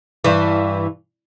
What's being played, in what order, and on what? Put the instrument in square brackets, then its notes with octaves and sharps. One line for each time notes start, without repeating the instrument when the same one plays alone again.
[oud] G2 E3